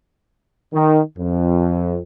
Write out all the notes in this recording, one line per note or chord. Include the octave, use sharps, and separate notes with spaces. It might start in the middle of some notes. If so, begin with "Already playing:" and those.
D#3
F2